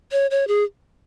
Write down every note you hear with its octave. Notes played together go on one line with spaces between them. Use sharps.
C#5
C#5
G#4